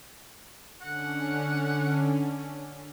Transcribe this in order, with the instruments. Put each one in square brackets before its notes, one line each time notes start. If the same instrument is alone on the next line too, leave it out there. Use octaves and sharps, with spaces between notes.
[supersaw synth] D3 C#4 [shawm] F#5